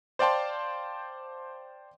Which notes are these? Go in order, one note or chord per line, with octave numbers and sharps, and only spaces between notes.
C5 D5 F5 G5 A5 C6